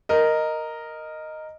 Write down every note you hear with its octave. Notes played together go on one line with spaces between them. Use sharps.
A#4 D#5